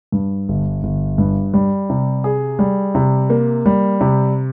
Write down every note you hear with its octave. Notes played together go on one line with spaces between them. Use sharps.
G2
G1
G1
G2
G3
C3
G#4
G3
C3
A#3
G3
C3